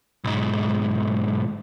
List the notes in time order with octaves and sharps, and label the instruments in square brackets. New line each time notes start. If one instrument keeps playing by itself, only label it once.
[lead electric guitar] B1 G#2